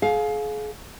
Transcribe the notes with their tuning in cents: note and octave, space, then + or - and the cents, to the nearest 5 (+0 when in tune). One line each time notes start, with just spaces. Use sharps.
G#4 +35 F5 +15